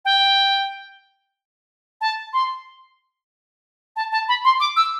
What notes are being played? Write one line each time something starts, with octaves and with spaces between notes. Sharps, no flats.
G5
A5
C6
A5
A5
B5
C6
D6
E6